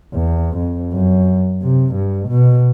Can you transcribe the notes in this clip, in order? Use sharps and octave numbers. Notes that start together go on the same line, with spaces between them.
E2
F2
F#2
C3
G2
B2